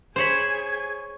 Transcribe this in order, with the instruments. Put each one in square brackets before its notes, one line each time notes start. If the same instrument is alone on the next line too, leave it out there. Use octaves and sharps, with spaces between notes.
[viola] G#4 G#5 [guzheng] C5 C#5 B5